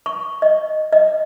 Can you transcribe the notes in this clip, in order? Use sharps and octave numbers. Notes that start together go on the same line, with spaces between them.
C#6
D#5
D#5